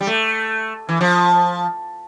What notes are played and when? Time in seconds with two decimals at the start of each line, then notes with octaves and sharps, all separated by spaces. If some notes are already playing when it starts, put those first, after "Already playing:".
0.01 G3
0.07 A3
0.89 E3
1.01 F3